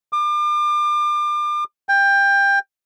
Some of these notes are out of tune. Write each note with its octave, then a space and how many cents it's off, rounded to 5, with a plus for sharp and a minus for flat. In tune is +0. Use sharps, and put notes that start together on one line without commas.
D6 +35
G5 +20